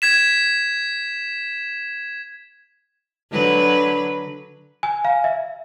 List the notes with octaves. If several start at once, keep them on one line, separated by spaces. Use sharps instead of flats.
G#6 B6 E7
D3 F#3 B4
G#5
F5
E5